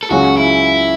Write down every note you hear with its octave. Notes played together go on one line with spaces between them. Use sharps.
A4
C#2 C#3 F#3 C#4 F#4
E4